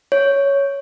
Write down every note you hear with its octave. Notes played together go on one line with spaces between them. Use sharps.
C#5